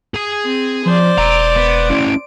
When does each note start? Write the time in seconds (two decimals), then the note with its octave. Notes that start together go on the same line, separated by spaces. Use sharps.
0.14 G#4 G#5
0.45 C4
0.85 F3 C5 D5
1.18 E1 C#5 A#5 D7
1.56 B3
1.90 C#4 E4